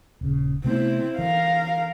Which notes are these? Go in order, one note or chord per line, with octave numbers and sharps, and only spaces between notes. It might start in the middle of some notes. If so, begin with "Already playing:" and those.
D#1 C#3
C3 A3 B3 C4 E4
E3 A#4 F5